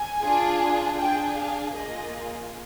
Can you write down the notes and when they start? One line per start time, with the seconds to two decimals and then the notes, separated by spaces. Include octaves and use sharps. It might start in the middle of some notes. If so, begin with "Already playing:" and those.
Already playing: G#5
0.22 D4 F4 G#4
0.98 D4 G#4 G5
1.37 F5
1.75 A#3 F4 G#4 D#5